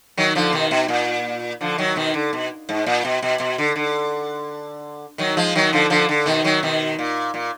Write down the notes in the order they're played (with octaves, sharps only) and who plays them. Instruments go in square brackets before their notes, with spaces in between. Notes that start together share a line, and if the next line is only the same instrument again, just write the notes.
[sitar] D#3 F#3
D3 F3
B2 D#3
B2
A#2
D3 F3
D#3 F#3
B2 D#3
D3
B2
G#2
A#2
B2
B2
B2
D3
D3
D#3 F#3
F3 G#3
D#3 F#3
D3 F3
D3 F3
D3
B2 D#3
D#3 F#3
B2 D#3
A#2
A#2